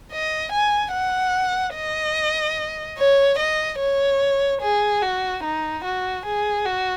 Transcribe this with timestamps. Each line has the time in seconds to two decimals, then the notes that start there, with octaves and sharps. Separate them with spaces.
0.12 D#5
0.52 G#5
0.93 F#5
1.75 D#5
2.98 C#5
3.39 D#5
3.80 C#5
4.62 G#4
5.02 F#4
5.44 D#4
5.84 F#4
6.26 G#4
6.65 F#4